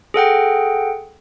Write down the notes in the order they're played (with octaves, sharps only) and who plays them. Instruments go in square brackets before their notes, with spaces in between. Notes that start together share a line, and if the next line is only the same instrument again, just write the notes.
[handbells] G#4 A4 F#5 G5